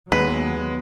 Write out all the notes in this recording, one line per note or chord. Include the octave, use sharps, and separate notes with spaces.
D#2 F#3 G#3 B3 B4